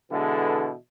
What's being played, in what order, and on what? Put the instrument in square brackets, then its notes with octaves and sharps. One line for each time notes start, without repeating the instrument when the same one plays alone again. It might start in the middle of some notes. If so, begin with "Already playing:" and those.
[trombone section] B2 D3 E3 G#3 E4 A4